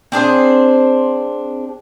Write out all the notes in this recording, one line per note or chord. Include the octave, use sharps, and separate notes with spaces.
C4 D4 G#4 C5